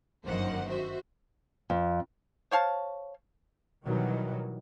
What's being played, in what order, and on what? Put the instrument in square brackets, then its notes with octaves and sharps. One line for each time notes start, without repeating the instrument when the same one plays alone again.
[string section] G1 F#2 D#3 A#3 C5 F#5
F#4 C5 E5
[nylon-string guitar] F2
[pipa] C5 C#5 F5 A5
[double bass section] B2 D#3 E3 F#3 G3